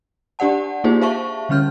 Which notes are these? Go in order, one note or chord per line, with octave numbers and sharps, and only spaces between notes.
D4 G4 D5 F#5 A5
A#3 D#4 F4 G4 G#4 C5
C5 E5 F5 A5 C#6
D3 G3 C#4 F6 G6